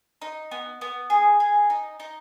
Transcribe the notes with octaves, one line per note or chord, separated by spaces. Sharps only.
D#4
B3
B3
G#4
G#4
D#4
D#4